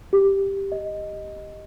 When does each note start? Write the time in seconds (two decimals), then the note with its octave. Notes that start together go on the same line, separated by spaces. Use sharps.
0.13 G4
0.72 D#5